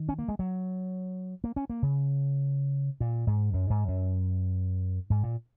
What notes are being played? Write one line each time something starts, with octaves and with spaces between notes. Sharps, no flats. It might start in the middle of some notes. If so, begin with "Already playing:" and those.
Already playing: D#3
C#4
A#3
G#3
F#3
A#3
C#4
A#3
C#3
A#2
G#2
F#2
G#2
F#2
G#2
A#2